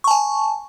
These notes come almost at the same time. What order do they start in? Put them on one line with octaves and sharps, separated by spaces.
C#6 A5 G#5